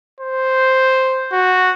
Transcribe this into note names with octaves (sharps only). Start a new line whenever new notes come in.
C5
F#4